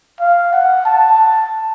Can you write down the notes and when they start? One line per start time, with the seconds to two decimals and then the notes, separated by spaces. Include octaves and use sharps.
0.20 F5
0.53 F#5
0.85 A5